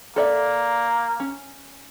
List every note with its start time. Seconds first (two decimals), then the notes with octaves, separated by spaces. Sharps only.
0.16 A#3 A4 D5 E5
1.20 C#4